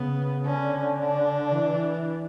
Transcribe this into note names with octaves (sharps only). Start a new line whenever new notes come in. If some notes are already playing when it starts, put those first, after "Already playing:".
Already playing: C#3 B3
D3 C#4
D4
E3